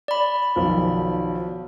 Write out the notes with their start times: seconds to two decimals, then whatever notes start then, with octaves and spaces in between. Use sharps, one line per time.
0.08 D5 B5
0.56 B1 D#3 F3